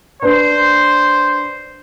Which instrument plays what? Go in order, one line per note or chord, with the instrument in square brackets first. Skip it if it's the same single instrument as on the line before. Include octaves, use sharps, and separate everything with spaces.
[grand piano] D4 B4 [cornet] C5